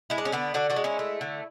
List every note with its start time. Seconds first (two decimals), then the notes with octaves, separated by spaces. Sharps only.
0.10 G#3 E4
0.18 D4
0.25 C#4
0.32 D3 B3 D4
0.54 D3 D4 F#4
0.70 D4 F#4
0.76 G#3
0.84 C#4 E4
0.99 A3
1.21 D3